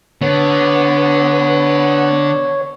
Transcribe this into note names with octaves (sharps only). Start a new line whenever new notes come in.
D3 B3 C#5